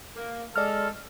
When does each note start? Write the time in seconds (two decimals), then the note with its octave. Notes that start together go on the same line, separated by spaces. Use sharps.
0.16 A#3
0.56 G#3 A4 D5 F6